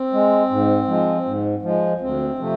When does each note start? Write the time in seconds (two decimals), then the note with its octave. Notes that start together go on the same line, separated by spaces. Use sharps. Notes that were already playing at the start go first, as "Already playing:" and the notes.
Already playing: C4
0.13 G#3
0.50 G#2
0.88 F3 G#3
1.25 G#2
1.62 F3 G#3
2.01 D2 C4
2.39 C3 F3 A3